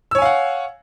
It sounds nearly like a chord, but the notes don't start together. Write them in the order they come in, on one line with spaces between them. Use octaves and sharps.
E6 C#5 G#5 F5 F#5